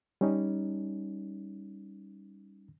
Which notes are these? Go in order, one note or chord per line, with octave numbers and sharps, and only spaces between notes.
G3 C#4 D#4